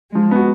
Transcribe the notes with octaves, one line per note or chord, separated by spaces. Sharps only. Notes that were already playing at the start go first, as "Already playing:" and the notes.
F3 G#3
B3 F#4